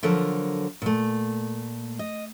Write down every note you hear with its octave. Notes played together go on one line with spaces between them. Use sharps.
D3 F3 F#3 A4 A#4
A#2 A3
D#5